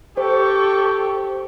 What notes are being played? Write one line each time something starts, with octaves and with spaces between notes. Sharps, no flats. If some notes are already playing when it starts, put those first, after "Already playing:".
G4 A4 C5 C#6